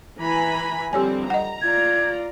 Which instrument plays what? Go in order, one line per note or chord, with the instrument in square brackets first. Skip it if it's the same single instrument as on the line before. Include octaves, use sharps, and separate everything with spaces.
[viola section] E3 G#5 B5 [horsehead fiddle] A#5
[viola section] D3 F3 C4 [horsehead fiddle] G3 [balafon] G4 C#5 G#5
[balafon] D#5 F#5 [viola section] A#5
[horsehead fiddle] F4 D5 [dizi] G#6